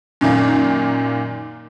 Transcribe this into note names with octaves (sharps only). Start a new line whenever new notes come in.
F#2 A#2 D#3 A#3